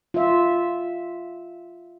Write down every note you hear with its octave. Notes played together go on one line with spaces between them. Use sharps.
F4 E5